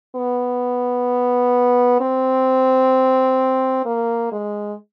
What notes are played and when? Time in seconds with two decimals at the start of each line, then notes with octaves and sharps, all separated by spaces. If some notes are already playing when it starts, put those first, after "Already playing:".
0.15 B3
2.01 C4
3.85 A#3
4.32 G#3